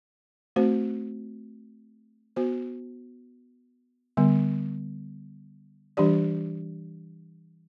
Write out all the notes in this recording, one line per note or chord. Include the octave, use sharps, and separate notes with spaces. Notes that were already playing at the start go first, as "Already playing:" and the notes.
A3 C4 F#4 C5
B3 F#4 C5
D3 G3 B3
E3 G3 D4 G4 D5